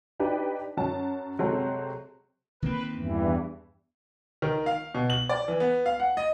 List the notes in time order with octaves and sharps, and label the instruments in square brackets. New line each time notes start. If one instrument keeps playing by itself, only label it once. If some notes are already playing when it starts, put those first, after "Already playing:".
[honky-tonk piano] D4 D#4 G4 B4 D5
F#2 F#3 A5
C3 F#3 G#3 C4 A4
[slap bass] D#3 A#3 C4 [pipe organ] B4
[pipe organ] E2 G2 E3
[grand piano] D#3
F5
B2
F#7
D5
E3
B3
F5
F#5
D#5